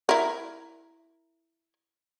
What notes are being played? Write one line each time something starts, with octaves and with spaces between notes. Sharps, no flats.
E4 A#4